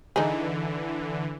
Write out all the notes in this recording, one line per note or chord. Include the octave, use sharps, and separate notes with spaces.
D3 E3 D#4 G#4